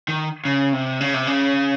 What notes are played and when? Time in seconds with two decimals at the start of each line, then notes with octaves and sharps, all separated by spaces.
0.08 D#3
0.45 C#3
0.73 C3
1.01 C#3
1.14 C3
1.27 C#3